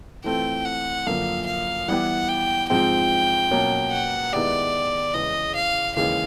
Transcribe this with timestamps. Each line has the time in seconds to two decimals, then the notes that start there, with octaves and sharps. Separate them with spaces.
0.24 E3 A3 C4 F4 A4 G5
0.65 F#5
1.07 F#2 D3 F3 A#3 F5
1.46 F5
1.88 E3 G3 B3 E4 G4 F#5
2.28 G5
2.70 G#2 F3 G#3 C4 G5
3.51 B2 F#3 A#3 C#4
3.92 F#5
4.33 D#3 G#3 B3 E4 G4 D5
5.14 E2 C#3 E3 G#3 D#5
5.55 F5
5.96 D#2 C#3 E3 G#3 F5